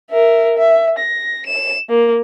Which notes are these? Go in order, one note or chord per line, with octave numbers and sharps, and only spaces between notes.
A#4 E5
E5
A#6
E7
A#3